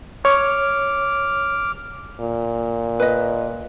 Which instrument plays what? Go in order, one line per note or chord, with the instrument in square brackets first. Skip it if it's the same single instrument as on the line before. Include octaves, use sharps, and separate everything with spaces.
[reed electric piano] C#5 [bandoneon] D6 F6
[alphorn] A#2
[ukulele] B4 D#5